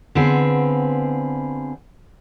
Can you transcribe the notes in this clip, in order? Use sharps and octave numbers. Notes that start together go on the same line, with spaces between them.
D3 B3 C4 F4 G#4 B4